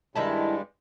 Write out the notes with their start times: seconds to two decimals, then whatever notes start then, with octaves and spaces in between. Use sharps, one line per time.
0.15 G2 D#3 G3 G#3 E4 A5